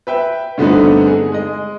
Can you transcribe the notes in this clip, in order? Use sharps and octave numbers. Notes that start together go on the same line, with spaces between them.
B4 E5 G5
G2 D3 A3 B3 C4 D#4
G#4
G#3 D#5